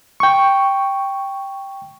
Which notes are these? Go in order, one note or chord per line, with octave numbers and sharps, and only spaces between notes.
G5 C#6